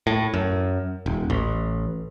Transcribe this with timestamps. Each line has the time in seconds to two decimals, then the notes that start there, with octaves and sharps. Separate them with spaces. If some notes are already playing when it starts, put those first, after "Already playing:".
0.07 A2
0.34 F#2
1.06 D#1
1.30 A1